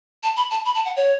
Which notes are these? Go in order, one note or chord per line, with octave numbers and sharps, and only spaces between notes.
A5
B5
A5
B5
A5
F#5
C#5